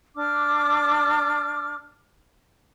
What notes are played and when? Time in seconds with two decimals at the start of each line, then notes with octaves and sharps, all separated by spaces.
0.16 D4 D6 F6